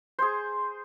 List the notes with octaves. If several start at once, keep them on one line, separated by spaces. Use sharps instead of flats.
G#4 C5